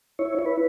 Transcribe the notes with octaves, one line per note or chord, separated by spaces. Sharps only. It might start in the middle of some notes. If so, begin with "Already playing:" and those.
E4 C#5
E4 C#5
B4